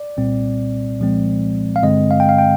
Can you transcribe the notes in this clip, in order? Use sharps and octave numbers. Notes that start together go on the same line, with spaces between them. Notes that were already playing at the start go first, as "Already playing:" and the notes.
Already playing: D5
C2 A#2 G3 C4
C2 A#2 F3 G#3 C4
F5
G2 D3 G#3 C4 D#5
F5
G5
F5
G5